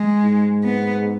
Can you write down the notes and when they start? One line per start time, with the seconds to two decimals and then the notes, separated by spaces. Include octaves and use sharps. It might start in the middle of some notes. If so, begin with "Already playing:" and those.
Already playing: G#3
0.24 G#2
0.64 B3